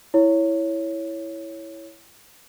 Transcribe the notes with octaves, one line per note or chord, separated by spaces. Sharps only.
E4 C#5